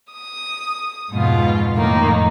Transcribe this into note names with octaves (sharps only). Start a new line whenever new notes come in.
D#6
F2 G#2 B2 F4
F2 A2 D#3 A#3 D#4